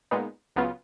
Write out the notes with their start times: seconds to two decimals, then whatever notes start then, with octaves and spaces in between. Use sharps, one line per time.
0.11 A#2 G#3 B3 D#4
0.56 C#2 C#3 F#3 B3 F4